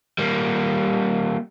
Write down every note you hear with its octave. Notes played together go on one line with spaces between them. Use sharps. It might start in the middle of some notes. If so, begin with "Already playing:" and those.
G3 A#3